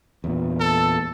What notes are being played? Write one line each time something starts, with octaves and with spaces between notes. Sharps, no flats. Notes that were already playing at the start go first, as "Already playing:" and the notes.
E2 A#2
A4